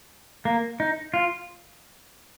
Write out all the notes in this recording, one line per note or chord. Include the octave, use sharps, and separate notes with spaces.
A#3
D#4
F4